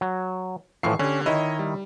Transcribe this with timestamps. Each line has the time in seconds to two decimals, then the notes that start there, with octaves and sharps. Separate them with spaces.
0.01 F#3
0.83 A2 E3 F3 C#6 C7
0.99 D3 C#4 G4
1.26 D#3 E4 C#5 D#5
1.59 G3